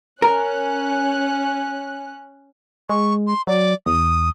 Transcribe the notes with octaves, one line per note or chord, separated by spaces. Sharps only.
C#4 A#4 F#6
G#3 C#6
C6
F#3 D5
E2 D#6